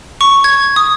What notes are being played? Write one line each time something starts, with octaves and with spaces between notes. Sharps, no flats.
C#6
G#6
D#6